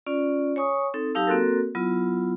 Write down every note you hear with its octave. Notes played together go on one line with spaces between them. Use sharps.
C#4 F4 D5
C#5 G#5 C#6 D#6
C4 D#4 A4
F#3 D#4 G4 F5 A5 E6
A#3 C4 F#4 A4 A#4
F#3 B3 E4 F4